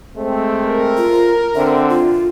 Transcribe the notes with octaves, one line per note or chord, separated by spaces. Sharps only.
G#3 A3 C4
A#4
F4
D3 C4 E5
F4